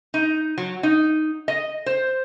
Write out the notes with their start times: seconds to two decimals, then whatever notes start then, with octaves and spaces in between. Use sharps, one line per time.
0.14 D#4
0.58 F#3
0.83 D#4
1.48 D#5
1.86 C5